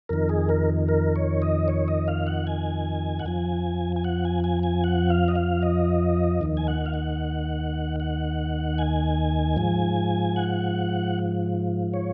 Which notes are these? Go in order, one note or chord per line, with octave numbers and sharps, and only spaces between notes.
F2 D#3 A#4
G#4
A#4
A#4
C#5
D#5
C#5
D#5
F5
F#5
G#5
F#5
F2 F3 G#5
G#5
F#5
G#5
G#5
G#5
F#5
F5
D#5
F5
D#5
D#2 D#3
G#5
F#5
F5
F#5
F#5
G#5
G#2 F3
F#5
C#5